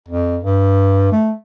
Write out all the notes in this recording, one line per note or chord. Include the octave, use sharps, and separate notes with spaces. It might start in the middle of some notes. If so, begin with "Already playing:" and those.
F2
G2
A3